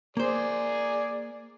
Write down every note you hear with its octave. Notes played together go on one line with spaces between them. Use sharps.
A#3 G#4 C5 D5